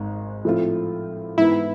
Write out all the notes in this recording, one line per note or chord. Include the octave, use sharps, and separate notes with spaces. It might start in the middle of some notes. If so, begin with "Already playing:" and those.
Already playing: G#1 G#2 G#3
A2 F3 A3 C4 F4
G#2 E3 B3 E4